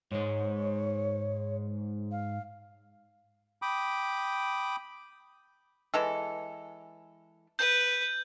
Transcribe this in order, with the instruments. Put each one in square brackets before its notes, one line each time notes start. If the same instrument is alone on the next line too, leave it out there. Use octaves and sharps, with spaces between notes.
[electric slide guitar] G#2 G#3 [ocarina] C#5
[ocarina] F5
[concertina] G5 B5 D6 D#6
[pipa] E3 G#3 A4
[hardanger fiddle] B4 [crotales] G6